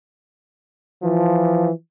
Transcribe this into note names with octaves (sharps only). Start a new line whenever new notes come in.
E3 F3